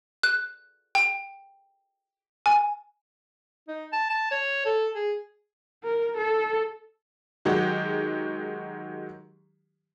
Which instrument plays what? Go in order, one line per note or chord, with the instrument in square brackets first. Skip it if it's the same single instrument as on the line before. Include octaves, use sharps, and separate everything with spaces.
[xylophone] F#6
G5
G#5
[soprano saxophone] D#4
A5
A5
C#5
A4
G#4
[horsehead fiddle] A#4
A4
[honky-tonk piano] D#3 F#3 G#3 F#4 G4